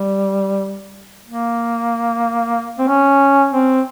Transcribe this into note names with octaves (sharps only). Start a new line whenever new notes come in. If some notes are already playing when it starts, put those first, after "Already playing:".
Already playing: G3
A#3
C4
C#4
C4